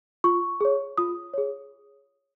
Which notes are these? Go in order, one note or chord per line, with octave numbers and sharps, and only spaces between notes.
F4 C#6
G#4 C#5
F4 D#6
G#4 C#5